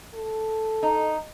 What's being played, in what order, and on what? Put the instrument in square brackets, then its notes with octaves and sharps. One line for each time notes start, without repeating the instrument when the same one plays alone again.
[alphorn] A4
[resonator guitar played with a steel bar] D#4